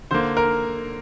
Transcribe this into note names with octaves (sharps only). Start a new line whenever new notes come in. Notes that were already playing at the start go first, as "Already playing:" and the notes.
D3 A#3 C5
A#4